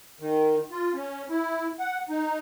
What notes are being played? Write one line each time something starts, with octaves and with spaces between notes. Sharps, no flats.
D#3
F4
C#4
E4
F#5
D#4